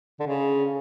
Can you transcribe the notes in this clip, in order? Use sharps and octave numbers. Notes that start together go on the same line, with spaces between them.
D3
C#3